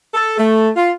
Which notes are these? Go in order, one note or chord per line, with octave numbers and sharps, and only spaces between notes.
A4
A3
F4